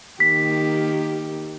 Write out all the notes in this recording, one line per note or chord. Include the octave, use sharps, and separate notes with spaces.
D#3 A#3 G4 B6